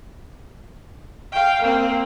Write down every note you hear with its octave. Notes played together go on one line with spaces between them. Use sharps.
F5 G5
A#3 C4